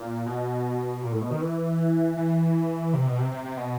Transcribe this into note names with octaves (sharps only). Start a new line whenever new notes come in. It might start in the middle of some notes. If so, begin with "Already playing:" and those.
Already playing: A#2
B2
A#2
A2
B2
D#3
E3
E3
C3
B2
C3
C3
C3
B2